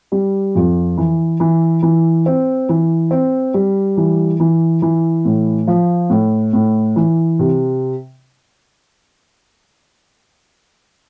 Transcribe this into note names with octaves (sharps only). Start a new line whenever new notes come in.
G3
F2
E3
E3
E3
C4
E3
C4
G3
E3
E3
E3
A2
F3
A2
A2
E3
C3